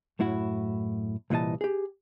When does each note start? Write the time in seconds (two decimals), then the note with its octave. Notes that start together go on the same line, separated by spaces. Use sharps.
0.19 F#2 A2 E4 F#4
1.30 C2 A#2 E3 D#5 A5
1.61 G4 G#4